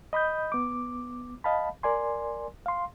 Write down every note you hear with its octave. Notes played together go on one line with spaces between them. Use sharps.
D#5 B5 D#6 G6
B3 D6
D#5 F5 A5 B5
A#4 D5 G#5 C6
F5 C6